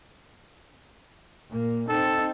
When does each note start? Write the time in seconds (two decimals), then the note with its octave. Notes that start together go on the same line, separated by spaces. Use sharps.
1.49 A#2 A#3
1.89 C4 D#4 A4